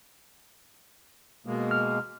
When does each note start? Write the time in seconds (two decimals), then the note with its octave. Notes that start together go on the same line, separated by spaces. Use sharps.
1.46 B2 G#3 A#3
1.71 F6